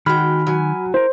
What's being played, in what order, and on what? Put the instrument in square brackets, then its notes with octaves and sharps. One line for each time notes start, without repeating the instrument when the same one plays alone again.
[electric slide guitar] D#3 [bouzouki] G#3 F#4 G5 [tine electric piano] B5 F6
[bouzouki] F#3 G#5
[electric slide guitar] E4 A#4 [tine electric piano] C5